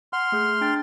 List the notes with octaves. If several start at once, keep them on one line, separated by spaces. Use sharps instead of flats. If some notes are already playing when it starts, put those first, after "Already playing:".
F#5 C6 F6
A3 G#4 G6
D4 G5 A6